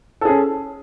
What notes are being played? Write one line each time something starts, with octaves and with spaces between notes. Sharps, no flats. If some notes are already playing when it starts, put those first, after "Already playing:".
C#4 G#4 A4